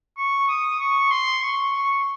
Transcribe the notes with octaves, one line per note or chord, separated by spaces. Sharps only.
C#6
D#6
C#6
C6
C#6
C#6